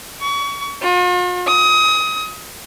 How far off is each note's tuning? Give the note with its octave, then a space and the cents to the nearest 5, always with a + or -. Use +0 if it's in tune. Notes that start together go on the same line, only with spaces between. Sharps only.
C#6 +30
F4 +45
D#6 +25